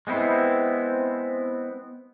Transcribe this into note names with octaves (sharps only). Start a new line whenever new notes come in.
G#3 B3 C4 E4